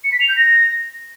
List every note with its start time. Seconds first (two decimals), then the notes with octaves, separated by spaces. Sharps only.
0.04 C#7
0.12 B6
0.20 F7
0.28 G6
0.37 A#6